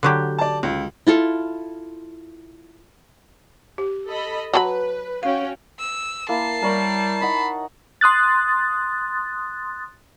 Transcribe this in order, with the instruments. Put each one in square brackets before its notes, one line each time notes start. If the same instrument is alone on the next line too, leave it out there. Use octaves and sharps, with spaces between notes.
[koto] D3 F#3 G4
[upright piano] D5 A5
C#2
[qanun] E4 F4 A4 F5
[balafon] G4
[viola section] A4 D#5 B5
[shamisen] F#3 G4 B5 [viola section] B4 [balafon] A5
[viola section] C#4 F#4 G5 [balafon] F5
[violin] E6
[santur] A#3 E4 [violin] A5 C7
[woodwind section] G3 [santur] A#4 C#5 B5
[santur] D#4 F#5 [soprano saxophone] B5
[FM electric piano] C6 D#6 F#6 A6